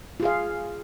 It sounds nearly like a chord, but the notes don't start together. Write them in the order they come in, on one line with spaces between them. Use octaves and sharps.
F4 G#4 F5